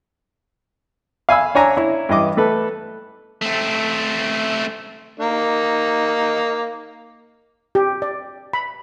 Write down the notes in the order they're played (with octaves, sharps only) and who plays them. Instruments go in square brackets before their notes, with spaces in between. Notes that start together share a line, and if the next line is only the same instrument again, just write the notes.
[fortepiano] F5 G#5 B5 E6
D4 C#5 G#5 A#5
E4 C#5
G2 E3 D#5 D6
A3 A4 B4
[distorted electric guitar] A3 C4
[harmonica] A#3 D#4
[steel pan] G4
D5
B5